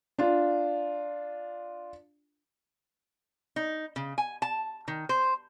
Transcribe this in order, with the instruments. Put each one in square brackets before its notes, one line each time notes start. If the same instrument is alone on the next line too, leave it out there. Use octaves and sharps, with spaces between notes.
[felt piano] D4 F4
[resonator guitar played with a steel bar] D#4
C#3
G#5
A5
D#3
C5